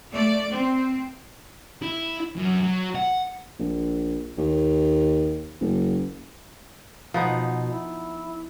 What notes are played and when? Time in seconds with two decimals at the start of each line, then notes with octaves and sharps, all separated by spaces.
0.12 A3 D5
0.52 C4
1.82 E4
2.37 F#2
2.63 F#3
2.95 F#5
3.59 A#1
4.37 D#2
5.61 F#1
7.14 B2 F3 B3 D#4
7.71 E4